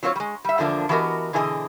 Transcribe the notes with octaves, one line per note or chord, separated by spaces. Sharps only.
F#3 C4 F4 C5 C#5
G3 G#3
G3 E5
E2 D3 F3 A#3 D4
E3 B3 F#4 G4 A#4 D#5
B2 D3 E3 G#4 A#4 D#5